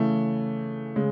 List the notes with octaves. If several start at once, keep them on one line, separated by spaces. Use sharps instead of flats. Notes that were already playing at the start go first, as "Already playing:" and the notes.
Already playing: C#3 E3 A3
C#3 G#3